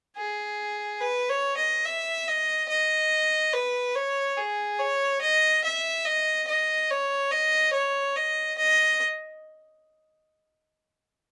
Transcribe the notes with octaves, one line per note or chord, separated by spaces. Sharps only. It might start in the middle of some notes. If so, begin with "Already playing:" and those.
G#4
B4
C#5
D#5
E5
D#5
D#5
B4
C#5
G#4
C#5
D#5
E5
D#5
D#5
C#5
D#5
C#5
D#5
D#5